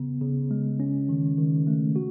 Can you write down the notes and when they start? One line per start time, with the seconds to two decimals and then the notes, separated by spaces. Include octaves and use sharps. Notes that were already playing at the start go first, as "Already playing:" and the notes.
Already playing: C#3 B3
0.21 C#3
0.51 G#3
0.80 C#4
1.09 D#3
1.38 D#3
1.67 A3
1.96 F#4